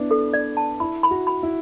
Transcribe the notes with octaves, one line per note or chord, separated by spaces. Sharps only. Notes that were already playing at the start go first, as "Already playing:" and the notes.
Already playing: B3 D4 E4
A4
D5
A5
E4 B5
B5
F#4
B5
E4